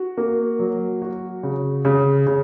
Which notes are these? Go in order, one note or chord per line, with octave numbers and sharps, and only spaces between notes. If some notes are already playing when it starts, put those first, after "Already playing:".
Already playing: F#4
A#3
F#3
F#4
C#3
C#3
C#3